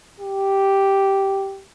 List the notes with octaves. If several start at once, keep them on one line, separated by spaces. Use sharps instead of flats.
G4